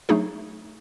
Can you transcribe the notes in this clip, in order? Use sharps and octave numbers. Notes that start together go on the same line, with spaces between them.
F#3 A3 D4 D#4 G#4